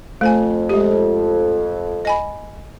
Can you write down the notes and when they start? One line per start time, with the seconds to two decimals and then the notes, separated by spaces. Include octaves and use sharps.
0.21 F2 A3 C5 G#5
0.69 G#3 G4
2.05 D#5 G#5 B5